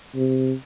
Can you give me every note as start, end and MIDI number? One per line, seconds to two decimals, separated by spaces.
0.15 0.53 48